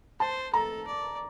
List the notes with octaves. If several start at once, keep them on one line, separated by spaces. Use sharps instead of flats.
C5 A5
A4 A#5
D5